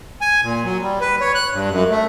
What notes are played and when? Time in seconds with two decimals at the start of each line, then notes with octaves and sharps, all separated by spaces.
0.21 G#5
0.42 A#2
0.64 F#3
0.81 G3
1.01 B4
1.21 C#5
1.35 F#6
1.53 G2
1.71 F#2
1.91 A3